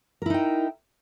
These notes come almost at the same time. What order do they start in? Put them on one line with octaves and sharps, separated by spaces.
A#4 E4 D#4 G5